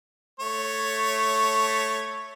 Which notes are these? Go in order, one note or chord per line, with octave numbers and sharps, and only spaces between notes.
A3 C#5